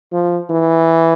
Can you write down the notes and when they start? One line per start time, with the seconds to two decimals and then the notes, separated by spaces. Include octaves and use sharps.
0.13 F3
0.50 E3